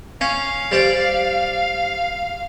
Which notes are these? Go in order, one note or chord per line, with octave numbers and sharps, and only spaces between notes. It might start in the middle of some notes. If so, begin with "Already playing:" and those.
C#4 F5
G3 C5 D5